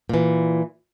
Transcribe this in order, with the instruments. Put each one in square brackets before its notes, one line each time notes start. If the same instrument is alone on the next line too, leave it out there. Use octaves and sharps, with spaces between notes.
[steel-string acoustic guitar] A#2 E3